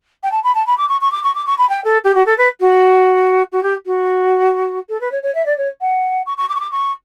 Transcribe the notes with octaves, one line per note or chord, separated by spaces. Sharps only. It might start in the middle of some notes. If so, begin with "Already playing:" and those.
G5
A5
B5
A5
B5
D6
C#6
C#6
D6
C#6
D6
C#6
B5
G5
A4
G4
F#4
A4
B4
F#4
F#4
G4
F#4
A4
B4
C#5
C#5
E5
D5
C#5
F#5
C#6
C#6
D6
C#6
D6
C#6